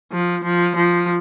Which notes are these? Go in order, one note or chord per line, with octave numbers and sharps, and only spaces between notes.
F3
F3
F3